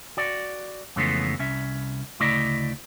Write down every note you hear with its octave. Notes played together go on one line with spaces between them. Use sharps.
F#4 D5
F2 C#3 E3 G#3 A3 B3
C2 C#4 E5
D2 C#3 A3 E4 D5 D#5